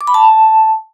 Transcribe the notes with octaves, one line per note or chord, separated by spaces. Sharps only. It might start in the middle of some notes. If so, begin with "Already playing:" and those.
D6
B5
A5